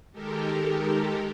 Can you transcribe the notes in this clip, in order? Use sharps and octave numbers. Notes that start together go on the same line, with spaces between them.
D#3 G#3 G4 A4 A#4